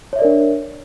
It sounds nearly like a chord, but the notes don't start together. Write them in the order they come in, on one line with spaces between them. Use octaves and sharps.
C#5 E5 D5 A#4 D4